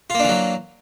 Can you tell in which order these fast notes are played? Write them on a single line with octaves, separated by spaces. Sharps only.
F4 A#3 D4 E3 F#3